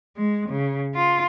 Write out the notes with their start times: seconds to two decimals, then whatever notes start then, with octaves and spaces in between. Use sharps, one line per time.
0.17 G#3
0.49 C#3
0.95 F4